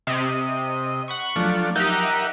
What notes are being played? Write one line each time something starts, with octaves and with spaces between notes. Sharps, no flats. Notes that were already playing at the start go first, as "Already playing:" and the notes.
C3 D#5
F#5 B5 C#6
F3 F#3 A3 D4 F4
D#4 G4 A#4 E5 F#5